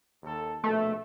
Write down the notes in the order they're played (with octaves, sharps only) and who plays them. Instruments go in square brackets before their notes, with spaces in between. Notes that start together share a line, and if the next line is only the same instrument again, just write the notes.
[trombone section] D#2 A4
[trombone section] A#1 B2 A4 [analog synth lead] A3